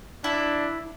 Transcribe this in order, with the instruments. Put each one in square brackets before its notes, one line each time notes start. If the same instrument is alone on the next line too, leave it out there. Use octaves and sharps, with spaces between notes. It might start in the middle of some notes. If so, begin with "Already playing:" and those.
[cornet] D4 [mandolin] E4